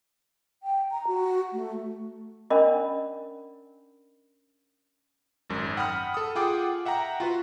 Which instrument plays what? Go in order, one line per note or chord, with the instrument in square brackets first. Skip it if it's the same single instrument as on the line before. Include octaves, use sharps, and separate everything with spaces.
[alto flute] G5
A#5
F#4
A3
[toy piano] C#4 D4 A#4 D5 D#5 B5
[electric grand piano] G#1 F#2
F#5 G5 B5 D#6 F6
A4 D#6
F4 G#4 F#5 G5 D6
E5 F#5 G5 A#5
F4 F#4 B4